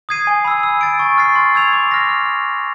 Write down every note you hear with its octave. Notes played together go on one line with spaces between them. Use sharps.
D#6 G#6 C7 D#7
G#5
B5 E6
E6
A6 D7
C#6
F6 A6 C7
C6
E6 G#6 C7 F7
D6
F6 A#6
F6